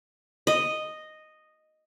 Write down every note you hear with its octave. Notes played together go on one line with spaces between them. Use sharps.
D#5